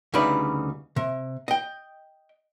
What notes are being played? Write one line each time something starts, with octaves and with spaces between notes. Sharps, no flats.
D2 C#3 G3 D#4 B4 D5
C3
D#5 G5